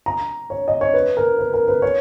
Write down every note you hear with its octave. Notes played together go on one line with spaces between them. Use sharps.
A#5
C#5
D#5
C#5
B4
A#4
B4
A#4
B4
C#5